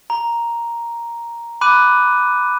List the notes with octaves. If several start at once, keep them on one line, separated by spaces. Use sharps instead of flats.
A#5
B5 D6 F#6 D#7